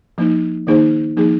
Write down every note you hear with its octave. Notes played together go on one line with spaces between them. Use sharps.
F3 A#3 D#4
D#3 A#3 D#4 G#4 C5
F3 A#3 D#4 G#4